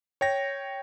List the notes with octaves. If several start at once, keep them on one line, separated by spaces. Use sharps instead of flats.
C#5 G5 A#6